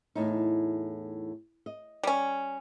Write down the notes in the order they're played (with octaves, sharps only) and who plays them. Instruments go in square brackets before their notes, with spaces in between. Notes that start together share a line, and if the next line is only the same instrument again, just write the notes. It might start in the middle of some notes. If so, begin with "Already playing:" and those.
[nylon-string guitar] E2 A2 D#4
D#5
[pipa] G3 C#4